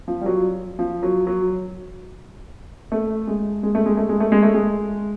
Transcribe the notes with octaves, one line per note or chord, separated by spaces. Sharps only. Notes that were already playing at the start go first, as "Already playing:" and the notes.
F3
G3
F#3
F3
F#3
F#3
A3
G#3
G#3
A3
G#3
A3
G#3
A3
G#3
A3
G#3